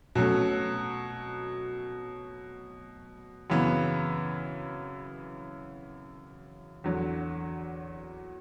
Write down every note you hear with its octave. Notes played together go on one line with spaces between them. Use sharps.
B2 F#3 A3 C#4
F#2 C#3 E3 B3
E2 D3 F#3